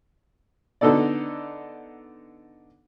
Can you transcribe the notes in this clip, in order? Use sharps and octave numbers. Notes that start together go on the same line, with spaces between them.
D3 B3 D#4 A4 D5